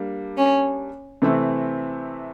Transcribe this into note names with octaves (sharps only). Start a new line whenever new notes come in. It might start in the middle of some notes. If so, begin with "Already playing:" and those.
Already playing: G3 A#3 D4
C#4
C3 E3 A3 C4